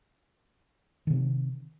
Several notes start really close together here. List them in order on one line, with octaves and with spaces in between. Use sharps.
D#3 C3 C4